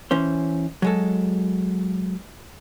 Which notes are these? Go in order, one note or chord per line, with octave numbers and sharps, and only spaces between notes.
E3 C#4 C5
F#3 G#3 A4